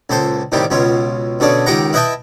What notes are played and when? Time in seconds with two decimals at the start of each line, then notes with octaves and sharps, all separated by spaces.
0.10 C#2 A#2 A4 C5
0.52 A2 C3 D#3 G3 G4
0.70 C#2 B2 C#4 F4
1.40 B2 D3 C#4 D4 G#4
1.66 C#2 D#3 G4 A#4 F#5 A#5
1.93 E4 B4 D#5 E5 G5 A5